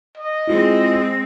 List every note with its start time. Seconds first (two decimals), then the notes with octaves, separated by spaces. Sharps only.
0.18 D#5
0.48 G#3 C4 E4 F4 G#4